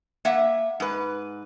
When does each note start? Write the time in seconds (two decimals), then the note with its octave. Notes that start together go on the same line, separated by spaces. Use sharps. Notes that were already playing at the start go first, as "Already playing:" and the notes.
0.25 A#3 E5 F#5
0.80 G#2 B4